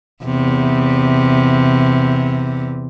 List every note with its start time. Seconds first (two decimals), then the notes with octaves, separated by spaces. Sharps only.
0.25 E2 C3